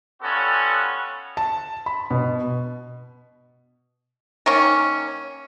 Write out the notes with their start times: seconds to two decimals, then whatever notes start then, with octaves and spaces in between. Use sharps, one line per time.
0.22 G3 B3 C#4 F4 F#4 A4
1.37 A5
1.86 B5
2.11 B2
4.46 D#3 A#3 C#4